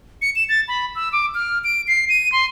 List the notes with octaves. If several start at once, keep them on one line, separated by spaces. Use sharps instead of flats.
C#7
E7
A6
B5
E6
D6
F6
D7
C7
D#7
C6